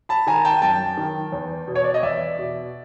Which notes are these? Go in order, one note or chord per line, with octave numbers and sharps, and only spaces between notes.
A5 B5
D#3 G#5 A#5
G5 A5
F#2 G5 A5
D#3
E2
B2
C#5
D5
D#5
E2 D5 E5
B2